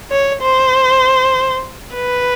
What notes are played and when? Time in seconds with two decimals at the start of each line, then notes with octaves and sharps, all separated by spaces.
0.11 C#5
0.41 C5
1.95 B4